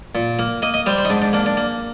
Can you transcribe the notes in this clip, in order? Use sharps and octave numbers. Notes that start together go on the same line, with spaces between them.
A#2
A#3
A#3 D#5
D#5
G3 C5
C5
D#4
G#2 D4
D4
A#3 D4
D4
A#3